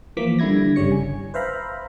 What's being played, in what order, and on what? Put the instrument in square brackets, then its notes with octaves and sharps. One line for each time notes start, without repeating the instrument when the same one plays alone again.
[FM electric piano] E3 F3 A#3 D6 B6
D3 G3 E4 G#6 A#6
G1 C#3 G3 C#5 C#7
G#5
B4 C5 E5 F5 A#5 B5